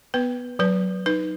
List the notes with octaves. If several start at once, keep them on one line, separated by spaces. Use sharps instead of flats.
B3 B4
F#3 B4
D#4 B4